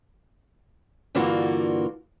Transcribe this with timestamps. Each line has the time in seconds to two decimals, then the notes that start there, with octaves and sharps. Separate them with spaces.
1.15 G2 D3 E3 A#3 F4 F#4